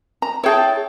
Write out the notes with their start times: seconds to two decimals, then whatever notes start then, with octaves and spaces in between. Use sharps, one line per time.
0.22 A#5
0.44 E4 G#4 C#5 G5 A5